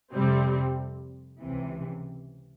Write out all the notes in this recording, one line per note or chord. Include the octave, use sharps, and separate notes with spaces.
F2 C3 G3 C4
C#2 C3 E3